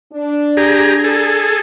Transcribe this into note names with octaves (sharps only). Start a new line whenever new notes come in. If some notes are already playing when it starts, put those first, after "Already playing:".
D4
G4 G#4 A#5
G#4 A4